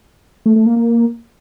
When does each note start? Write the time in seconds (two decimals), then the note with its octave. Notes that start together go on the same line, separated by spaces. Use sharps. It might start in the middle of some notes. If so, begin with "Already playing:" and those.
0.46 A3
0.56 A3
0.66 A#3
0.76 A#3